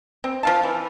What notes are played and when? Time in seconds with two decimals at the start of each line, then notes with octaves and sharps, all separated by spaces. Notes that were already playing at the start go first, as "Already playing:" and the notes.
0.24 C4
0.43 F3 F5 A5
0.63 E3